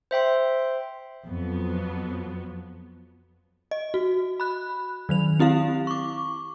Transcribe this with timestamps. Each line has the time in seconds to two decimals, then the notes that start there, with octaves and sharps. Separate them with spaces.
0.11 C5 E5 G5 C6
1.24 F2 F3 F#3 B3
3.71 D#5
3.94 F#4
4.40 B5 F#6
5.09 D#3 F#3 F7
5.39 C4 E4 G4 F5
5.87 C#6 D6